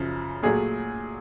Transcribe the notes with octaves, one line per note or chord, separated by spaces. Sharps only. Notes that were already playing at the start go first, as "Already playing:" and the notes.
Already playing: F#2 C#3 F3
A#2 F#3 A3 G#4